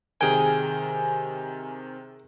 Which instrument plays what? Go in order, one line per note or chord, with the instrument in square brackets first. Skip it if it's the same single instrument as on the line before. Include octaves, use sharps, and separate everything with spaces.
[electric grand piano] C3 D#3 A#4 [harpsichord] G#4 G5 [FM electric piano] G#5